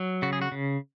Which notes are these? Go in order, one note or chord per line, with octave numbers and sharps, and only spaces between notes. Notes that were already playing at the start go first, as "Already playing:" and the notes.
Already playing: F#3
C#3 F#4
G#4
F#4
C#3